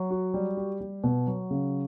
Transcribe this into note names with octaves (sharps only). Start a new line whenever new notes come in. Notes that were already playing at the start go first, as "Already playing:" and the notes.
Already playing: F#3
F#4
G3
G4
G3
B2
F#3
C#3